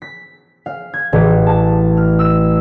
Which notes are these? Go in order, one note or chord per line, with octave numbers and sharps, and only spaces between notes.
B6
F5
G#6
A1
A5
F6
E6